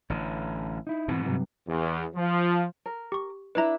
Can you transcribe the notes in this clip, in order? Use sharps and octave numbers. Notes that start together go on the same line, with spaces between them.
A1 D3
D#4 E4
G#2 B2 E3 C4
G2 C3 F#3
E2
F3
A#4
G4 C#6
D4 E4 B4 E5 A#5